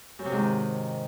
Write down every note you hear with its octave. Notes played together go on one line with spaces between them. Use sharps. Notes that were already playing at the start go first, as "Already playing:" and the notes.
F#2
C3
G#2
D#3